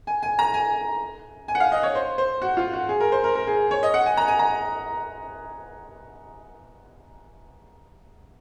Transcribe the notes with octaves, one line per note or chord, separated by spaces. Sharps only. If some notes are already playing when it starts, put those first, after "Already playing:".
G#5
G#5
A#5
G#5
G#5
F#5
F5
D#5
C#5
C5
C5
F#4
F4
F#4
G#4
A#4
C5
A#4
A#4
G#4
C#5
D#5
F#5
G#5
A#5
G#5
A#5